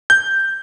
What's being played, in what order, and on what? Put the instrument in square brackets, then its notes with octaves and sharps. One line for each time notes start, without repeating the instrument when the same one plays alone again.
[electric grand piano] G6